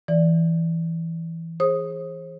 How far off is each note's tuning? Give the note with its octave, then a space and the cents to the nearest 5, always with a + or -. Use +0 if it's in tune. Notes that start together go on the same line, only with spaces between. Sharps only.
E3 +0 D5 +0
G#4 +0 C5 +35 D#6 +0